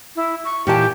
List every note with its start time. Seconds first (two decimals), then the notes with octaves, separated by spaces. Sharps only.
0.16 E4
0.45 C#6
0.67 A#2 E3 G4 A5